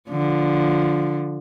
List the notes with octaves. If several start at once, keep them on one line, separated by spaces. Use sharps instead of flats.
D3 F3